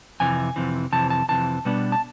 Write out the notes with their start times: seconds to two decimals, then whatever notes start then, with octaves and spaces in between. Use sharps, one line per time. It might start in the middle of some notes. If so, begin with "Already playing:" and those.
0.20 F2 C3 E3 G#5
0.56 F2 C3 E3
0.92 F2 C3 E3 A5
1.10 A5
1.29 F2 C3 E3 A5
1.65 B2 G3 B3 D4
1.92 A5